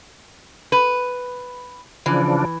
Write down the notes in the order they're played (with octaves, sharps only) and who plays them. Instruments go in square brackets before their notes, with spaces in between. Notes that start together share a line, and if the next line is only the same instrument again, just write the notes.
[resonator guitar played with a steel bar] B4
[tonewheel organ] C#3 F3 D4 [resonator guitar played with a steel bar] E3